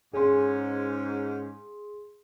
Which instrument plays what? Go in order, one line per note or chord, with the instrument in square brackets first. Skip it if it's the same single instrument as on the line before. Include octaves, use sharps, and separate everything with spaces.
[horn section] G#2 C#4 [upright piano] G#4 C6